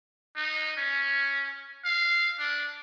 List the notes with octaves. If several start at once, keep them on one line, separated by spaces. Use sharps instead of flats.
D#4
C#4
F5
D4